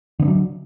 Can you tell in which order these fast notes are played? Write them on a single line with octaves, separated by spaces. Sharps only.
D3 B3 D4 F#3